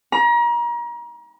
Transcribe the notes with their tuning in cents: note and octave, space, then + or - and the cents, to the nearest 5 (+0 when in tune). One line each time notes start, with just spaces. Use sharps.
A#5 +35